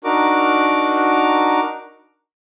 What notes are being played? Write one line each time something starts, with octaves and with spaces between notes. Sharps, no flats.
D4 D#4 F#4 A#4 D6